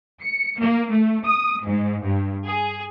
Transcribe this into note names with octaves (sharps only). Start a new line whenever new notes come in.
C#7
A#3
A3
D#6
G#2
G2
G#4